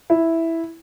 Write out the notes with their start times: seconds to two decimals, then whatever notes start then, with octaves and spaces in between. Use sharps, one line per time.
0.10 E4